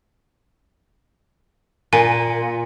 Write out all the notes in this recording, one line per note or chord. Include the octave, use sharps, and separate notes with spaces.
A#2 G#5 D#7